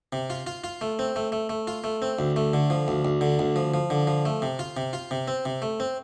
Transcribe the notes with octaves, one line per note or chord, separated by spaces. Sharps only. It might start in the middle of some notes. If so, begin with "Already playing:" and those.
C3
F4
F4
F4
A3
C4
A3
A3
A3
F4
A3
C4
D2
A3
D3
F3
D2
D2
D3
D2
F3
F3
D3
F3
A3
C3
F4
C3
F4
C3
C4
C3
A3
C4